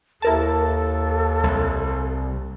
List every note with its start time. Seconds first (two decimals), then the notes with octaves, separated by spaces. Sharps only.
0.22 D#2 E4 A4 A#4 A5
1.44 C2